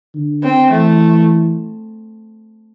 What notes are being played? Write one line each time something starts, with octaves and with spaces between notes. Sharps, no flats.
D3
C4
E3 A3